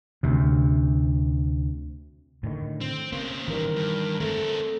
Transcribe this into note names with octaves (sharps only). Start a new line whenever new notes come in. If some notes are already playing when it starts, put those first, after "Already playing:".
D2 C3
A2 D3 D#3
C4
C#3 A#3 C4
D#3 E3 G3 A#4
G2
A3 C4 A4 A#4